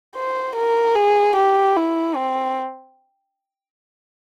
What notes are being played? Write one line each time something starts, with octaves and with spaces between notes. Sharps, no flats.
C5
A#4
G#4
G4
E4
C4